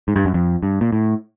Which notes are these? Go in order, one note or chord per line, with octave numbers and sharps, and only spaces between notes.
G#2
G2
F#2
F2
G2
A#2
A2